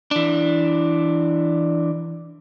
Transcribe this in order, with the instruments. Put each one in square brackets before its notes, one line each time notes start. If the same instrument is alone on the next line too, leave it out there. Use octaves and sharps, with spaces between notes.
[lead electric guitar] E3 D4